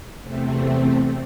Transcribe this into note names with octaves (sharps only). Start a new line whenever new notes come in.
E2 C3 A3 C4